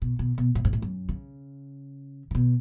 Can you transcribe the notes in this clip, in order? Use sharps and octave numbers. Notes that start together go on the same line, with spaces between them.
B2
B2
B2
A2
G#2
A2
F#2
C#3
C#3
B2